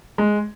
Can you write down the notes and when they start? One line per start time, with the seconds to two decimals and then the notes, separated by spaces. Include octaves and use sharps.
0.18 G#3